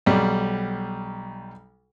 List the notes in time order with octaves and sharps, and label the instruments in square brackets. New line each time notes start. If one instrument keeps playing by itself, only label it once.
[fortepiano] B1 G3